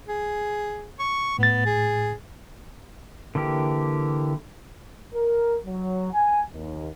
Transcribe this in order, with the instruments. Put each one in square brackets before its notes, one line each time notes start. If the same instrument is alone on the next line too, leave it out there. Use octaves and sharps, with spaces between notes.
[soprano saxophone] G#4
C#6
[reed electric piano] A2 A6 [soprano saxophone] B3
[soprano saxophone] G#4
[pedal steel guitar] D3 E3 A#3 G4
[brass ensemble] A#4
F#3
G#5
D#2